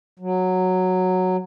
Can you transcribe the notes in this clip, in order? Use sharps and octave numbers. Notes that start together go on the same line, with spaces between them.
F#3